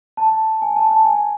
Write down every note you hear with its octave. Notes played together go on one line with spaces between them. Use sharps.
A5
G#5
A5
A5
G#5